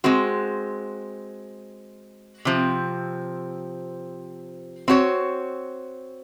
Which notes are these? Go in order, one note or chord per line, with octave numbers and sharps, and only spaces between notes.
G#3 C4 F#4
C3 F3 C4
C4 F#4 C#5